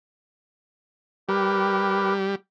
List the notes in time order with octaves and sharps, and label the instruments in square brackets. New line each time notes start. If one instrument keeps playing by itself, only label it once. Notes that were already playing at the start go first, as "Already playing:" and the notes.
[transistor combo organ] G3 [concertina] G4 A#4 B4